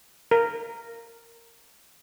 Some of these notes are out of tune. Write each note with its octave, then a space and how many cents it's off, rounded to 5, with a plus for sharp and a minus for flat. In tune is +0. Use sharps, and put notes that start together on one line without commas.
A#4 -10